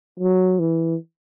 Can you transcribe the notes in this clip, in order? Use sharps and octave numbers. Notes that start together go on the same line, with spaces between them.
F#3
E3